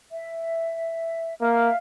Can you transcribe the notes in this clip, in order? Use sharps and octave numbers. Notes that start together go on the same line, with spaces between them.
E5
A#3 E5 F5 F6